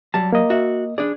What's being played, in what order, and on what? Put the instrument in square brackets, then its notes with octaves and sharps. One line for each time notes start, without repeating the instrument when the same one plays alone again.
[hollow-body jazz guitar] F#3 G3 [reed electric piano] A5
[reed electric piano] A#3 D#5
[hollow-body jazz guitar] F#4 E5
[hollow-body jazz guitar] D4 G#4 [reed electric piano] D5